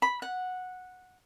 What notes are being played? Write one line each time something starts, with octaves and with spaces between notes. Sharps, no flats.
B5
F#5